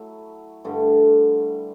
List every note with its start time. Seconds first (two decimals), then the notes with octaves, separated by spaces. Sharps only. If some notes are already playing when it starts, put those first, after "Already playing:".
Already playing: F#3 A3 E4
0.64 G2 D3 A3